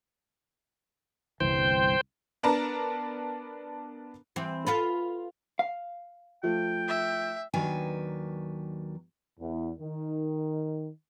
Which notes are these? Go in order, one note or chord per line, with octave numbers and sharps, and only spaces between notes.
G1 C2 E3 C5 G5
B3 D4 A#4 A5 A#5
E3 C4
F4 A4 B4
F5
F3 A3 F4 G5
E5
D#2 D#3 F#3 D4 B4 G#5
E2
D#3